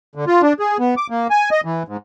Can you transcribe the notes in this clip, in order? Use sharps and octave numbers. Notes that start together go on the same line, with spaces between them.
D3
F4
D4
G#4
B3
D6
A#3
G#5
D#5
E3
G#2